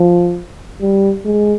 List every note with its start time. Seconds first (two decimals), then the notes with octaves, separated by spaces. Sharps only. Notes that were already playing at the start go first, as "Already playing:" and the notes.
Already playing: F3
0.81 G3
1.25 G#3